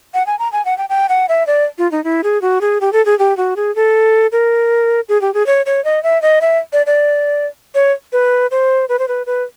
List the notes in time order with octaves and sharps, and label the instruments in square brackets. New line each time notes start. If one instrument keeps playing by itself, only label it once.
[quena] F#5
G#5
A#5
G#5
F#5
G5
G5
F#5
E5
D5
F4
D#4
E4
G#4
F#4
G#4
G4
A4
G#4
G4
F#4
G#4
A4
A#4
G#4
G4
G#4
C#5
C#5
D#5
E5
D#5
E5
D5
D5
C#5
B4
C5
B4
C5
B4
B4